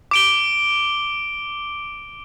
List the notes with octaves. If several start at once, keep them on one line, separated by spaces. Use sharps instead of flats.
D6 D7 G7